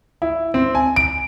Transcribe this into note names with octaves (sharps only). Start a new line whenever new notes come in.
E4
C4
G#5
D7